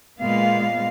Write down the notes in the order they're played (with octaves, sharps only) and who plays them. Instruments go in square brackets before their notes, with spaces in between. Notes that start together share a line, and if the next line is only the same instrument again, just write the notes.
[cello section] A#2 G#3 B3 F5